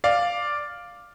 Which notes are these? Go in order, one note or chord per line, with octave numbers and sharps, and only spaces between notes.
D5 F5